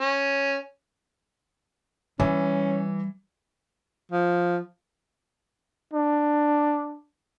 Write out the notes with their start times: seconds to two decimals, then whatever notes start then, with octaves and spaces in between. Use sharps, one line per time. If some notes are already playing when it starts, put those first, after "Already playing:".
0.01 C#4
2.20 E3 G3 C#4
4.12 F3
5.93 D4